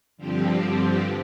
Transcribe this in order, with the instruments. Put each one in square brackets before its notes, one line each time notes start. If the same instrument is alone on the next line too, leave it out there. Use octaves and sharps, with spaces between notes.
[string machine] G2 D3 F3 C4 G4